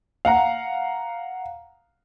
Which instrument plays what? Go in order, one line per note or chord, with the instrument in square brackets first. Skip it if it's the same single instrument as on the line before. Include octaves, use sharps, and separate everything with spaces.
[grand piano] F5 F#5 A#5